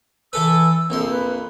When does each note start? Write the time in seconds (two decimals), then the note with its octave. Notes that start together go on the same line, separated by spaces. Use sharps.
0.33 E3 A4 B4 E6
0.90 A#1 F2 C6
1.10 B4